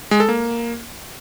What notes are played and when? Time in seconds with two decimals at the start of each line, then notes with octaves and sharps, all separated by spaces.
0.11 G#3
0.20 A4
0.29 A#3